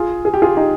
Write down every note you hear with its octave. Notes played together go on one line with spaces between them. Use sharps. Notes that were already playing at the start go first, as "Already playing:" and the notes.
Already playing: F4 G#4
G#4
G4
F4 G#4
D#4 G4